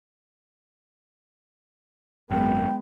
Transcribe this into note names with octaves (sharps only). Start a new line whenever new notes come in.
G#1 F#2 G#3 B3 G5